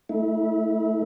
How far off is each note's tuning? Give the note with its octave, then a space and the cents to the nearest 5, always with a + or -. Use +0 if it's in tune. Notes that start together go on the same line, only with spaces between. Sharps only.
A3 +0 E4 -30